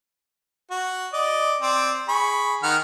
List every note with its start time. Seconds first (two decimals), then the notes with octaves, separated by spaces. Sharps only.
0.71 F#4
1.13 D5 D#5
1.61 C4 D5
2.08 G#4 B5 C#6
2.63 D#3 F#5 F6